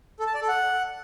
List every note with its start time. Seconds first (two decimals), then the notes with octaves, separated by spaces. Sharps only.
0.20 A4
0.27 A5
0.34 D5
0.41 A4
0.48 F#5